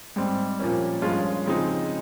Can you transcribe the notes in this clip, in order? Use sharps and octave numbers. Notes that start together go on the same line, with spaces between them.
G#2 G3 C4
A#2 F3 A#3 C#4
G2 F3 G#3 C#4 F4
C#3 F3 G#3 C4 D#4